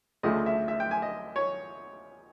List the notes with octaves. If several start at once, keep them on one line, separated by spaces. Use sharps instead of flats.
D2 C#3 F3 A3 D#5
E5
E5
G5
G#5
D#5
C#5